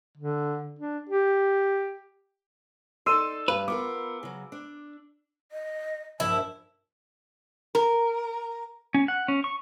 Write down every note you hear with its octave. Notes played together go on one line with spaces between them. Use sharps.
D3
D4
G4
D#4 A4 D5 C6 E6 D#7
G2 B4
B3 F4 A#4 D6
C#3 F#3
D4
D#5
A#1 G2 E4 A5
A#4
C#4
F#5
C#4
C#6